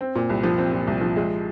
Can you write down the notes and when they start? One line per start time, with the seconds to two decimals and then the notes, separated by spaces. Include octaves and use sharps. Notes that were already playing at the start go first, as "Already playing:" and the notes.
0.01 C4
0.15 A#2
0.29 C2
0.43 F3
0.58 C4
0.73 A#2
0.87 C2
1.01 F3
1.16 G#3